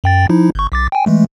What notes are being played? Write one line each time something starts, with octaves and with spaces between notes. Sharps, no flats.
F#2 G5 A6
F3 D#4 E4
G1 C#6
B1 D6 A6
G5 G#5
E3 G#3 A3